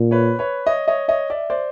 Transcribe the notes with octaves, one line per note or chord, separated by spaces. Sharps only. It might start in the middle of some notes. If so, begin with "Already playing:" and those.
Already playing: A#2
B4 C#5
B4 C#5
C#5 D#5
C#5 D#5
C#5 D#5
D5 E5
C5 D5